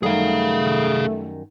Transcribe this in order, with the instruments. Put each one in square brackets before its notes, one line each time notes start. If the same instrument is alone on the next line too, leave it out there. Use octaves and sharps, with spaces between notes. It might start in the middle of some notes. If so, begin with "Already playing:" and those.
[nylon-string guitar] F#2 D#3 G3 [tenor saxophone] A3 [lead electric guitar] G#4 F5